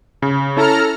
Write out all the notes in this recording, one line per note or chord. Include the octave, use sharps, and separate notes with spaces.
C#3
C#4 E4 A4 A5 A#5 F6